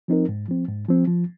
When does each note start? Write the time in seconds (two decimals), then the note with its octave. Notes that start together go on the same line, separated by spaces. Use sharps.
0.08 F3 C4 D#4 A#4
0.29 G#2
0.48 F3 C4
0.68 G#2
0.88 F3 C4
1.07 F3